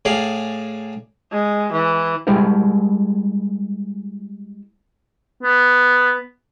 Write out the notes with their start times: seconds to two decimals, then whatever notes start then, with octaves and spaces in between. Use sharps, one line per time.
0.05 A2 G#4 D5 F5
1.32 G#3
1.72 E3
2.27 G3 G#3 E4 A#4 C5
5.43 B3